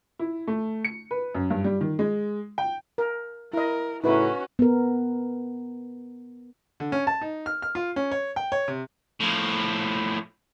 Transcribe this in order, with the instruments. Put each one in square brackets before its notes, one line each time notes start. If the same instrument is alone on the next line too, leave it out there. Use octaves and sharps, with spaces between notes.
[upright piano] E4
A3
C#7
B4
F#2
G2
G3
D#3
G#3
G5
[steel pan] A#4
[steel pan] E4 D#5 [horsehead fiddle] A#4
[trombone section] A2 C#3 E4 [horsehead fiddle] C#4 F#4 [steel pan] D#4 B4
[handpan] B3 A#4
[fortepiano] D3
C#4
A5
D#4
F6
F6
F4
C#4
C#5
G5
C#5
C3
[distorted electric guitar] A2 F3